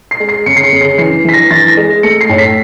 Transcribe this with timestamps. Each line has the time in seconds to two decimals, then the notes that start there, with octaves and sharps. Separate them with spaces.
0.11 C7
0.20 G#3
0.29 C7
0.46 C#3 C#7
0.57 C7
0.64 C#7
0.73 C#3
0.81 C7
0.98 E3 C7
1.25 E3 B6
1.34 A#6
1.51 E3 A6
1.68 A#6
1.77 G#3
2.03 A3 C#7
2.21 C7
2.29 A2
2.38 B6